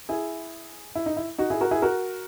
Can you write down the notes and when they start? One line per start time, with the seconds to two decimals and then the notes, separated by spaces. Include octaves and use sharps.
0.09 E4 G#4
0.95 E4
1.06 D#4
1.17 E4
1.38 D#4 F#4
1.50 E4 G#4
1.61 F#4 A#4
1.71 E4 G#4
1.82 F#4 A#4